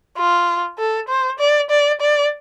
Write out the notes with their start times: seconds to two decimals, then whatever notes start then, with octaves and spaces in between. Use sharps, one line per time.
0.17 F4
0.78 A4
1.09 C5
1.39 D5
1.70 D5
2.01 D5